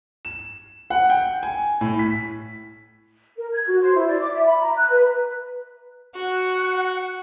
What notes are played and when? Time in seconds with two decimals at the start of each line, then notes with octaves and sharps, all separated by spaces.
0.25 E7
0.90 F#5
1.10 G5
1.43 G#5
1.81 A2
1.99 B6
3.37 A#4
3.53 G#6
3.67 F#4
3.82 C5
3.95 E4
4.07 D5
4.21 D6
4.34 E5
4.46 B5
4.61 A#5
4.76 F#6
4.90 B4
6.15 F#4 F#5